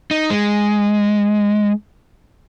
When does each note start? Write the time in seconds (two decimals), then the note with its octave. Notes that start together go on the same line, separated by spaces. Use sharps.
0.11 D#4
0.30 G#3